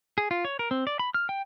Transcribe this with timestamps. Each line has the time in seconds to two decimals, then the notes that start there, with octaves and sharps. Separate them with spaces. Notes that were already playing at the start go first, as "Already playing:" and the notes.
0.18 G#4
0.31 F4
0.45 C#5
0.59 A#4
0.71 C4
0.87 D5
0.99 B5
1.14 F6
1.29 G5